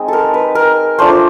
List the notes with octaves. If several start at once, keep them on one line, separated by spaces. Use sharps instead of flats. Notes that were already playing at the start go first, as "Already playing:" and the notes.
Already playing: G#3 C4 D#4
A4 A#4
B4
A#4
A3 D4 F4 C5